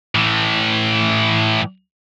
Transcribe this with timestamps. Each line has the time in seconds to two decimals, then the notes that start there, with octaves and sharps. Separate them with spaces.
0.15 A2 E3